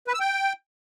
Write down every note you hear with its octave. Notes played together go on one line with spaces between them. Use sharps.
B4
E6
G5